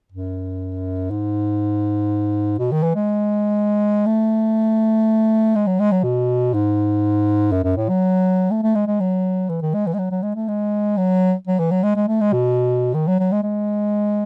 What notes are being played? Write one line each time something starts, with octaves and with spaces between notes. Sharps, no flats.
F#2
G#2
B2
D#3
E3
G#3
A3
G#3
F#3
G#3
F#3
B2
G#2
F#2
F#2
A2
F#3
A3
A3
G#3
G#3
F#3
E3
D#3
G#3
E3
G#3
F#3
F#3
G#3
A3
G#3
F#3
F#3
E3
F#3
G#3
G#3
A3
G#3
B2
D#3
F#3
F#3
G#3
G#3